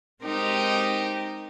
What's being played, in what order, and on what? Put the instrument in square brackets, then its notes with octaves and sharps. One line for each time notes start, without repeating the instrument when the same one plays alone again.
[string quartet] G#3 C4 D#4 G4 A#4